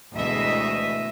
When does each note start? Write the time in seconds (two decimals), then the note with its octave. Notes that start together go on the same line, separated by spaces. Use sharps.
0.14 D2 B2 E3 G#3 D#5 E5